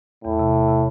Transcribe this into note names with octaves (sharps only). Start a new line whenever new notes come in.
E2 A2
C3
C3
C3